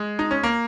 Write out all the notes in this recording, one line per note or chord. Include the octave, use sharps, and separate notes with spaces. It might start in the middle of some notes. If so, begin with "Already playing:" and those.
Already playing: G#3
D#4
C#4
A#3